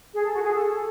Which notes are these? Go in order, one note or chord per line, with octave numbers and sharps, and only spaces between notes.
G#4
A4
F#4
G#4
A4